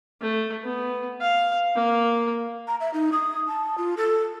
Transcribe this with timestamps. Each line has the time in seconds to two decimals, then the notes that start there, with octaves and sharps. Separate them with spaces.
0.22 A3
0.64 B3
1.21 F5
1.76 A#3
2.68 A#5
2.80 E5
2.94 D#4
3.12 D#6
3.48 A5
3.78 F4
3.97 A4